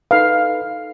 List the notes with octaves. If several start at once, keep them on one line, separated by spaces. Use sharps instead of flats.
D#4 A4 B4 F5